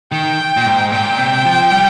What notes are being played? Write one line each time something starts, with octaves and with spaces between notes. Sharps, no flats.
D#3 G5
A#2
G#2
A#2 G5
C3
F3
G3